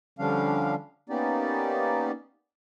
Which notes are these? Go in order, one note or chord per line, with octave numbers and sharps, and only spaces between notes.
D3 F3 G3 C#4 D4 F5
A#3 B3 C#4 D#4 G4 D5